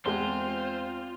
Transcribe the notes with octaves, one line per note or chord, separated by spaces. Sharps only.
E2 G#3 C4 F4 C5